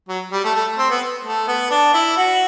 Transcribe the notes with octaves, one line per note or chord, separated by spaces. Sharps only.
F#3
G3
A3
A3
C4
B3
A3
B3
D4
E4
F#4